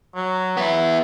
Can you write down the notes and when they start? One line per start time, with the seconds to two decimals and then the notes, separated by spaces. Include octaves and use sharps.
0.15 F#3
0.57 B3 E4